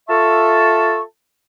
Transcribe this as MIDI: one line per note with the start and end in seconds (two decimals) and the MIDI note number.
0.09 1.02 65
0.09 1.02 69
0.09 1.02 76
0.09 1.02 81
0.09 1.02 85